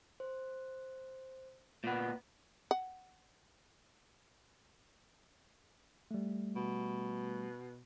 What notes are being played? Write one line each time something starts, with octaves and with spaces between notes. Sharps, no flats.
C5
A#2 B3
F#5
G3 A3
B2